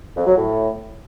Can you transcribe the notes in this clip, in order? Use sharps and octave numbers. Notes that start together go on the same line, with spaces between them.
F2
F#3
A2